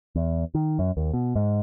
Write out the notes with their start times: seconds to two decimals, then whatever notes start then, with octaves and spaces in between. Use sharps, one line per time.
0.16 E2
0.55 D#3
0.79 F#2
0.97 D#2
1.14 B2
1.36 G#2